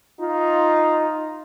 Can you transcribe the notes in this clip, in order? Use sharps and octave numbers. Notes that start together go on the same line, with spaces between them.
D#4 F4